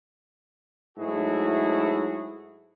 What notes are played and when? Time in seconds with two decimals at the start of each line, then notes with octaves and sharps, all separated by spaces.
0.98 G#2 F#3 A3 E4 F#4 G#4